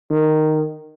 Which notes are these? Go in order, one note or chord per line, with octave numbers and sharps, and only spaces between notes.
D#3